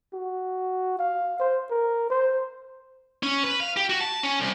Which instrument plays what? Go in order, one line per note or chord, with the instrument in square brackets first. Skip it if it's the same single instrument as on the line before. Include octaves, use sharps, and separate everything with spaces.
[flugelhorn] F#4
F5
C5
A#4
C5
[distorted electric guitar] C#4
B4
F5
G4
F#4
A5
C#4
C2